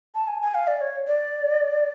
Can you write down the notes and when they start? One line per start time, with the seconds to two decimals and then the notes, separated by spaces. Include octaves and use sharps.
0.15 A5
0.28 G#5
0.42 G#5
0.55 F5
0.67 D5
0.81 C#5
1.07 D5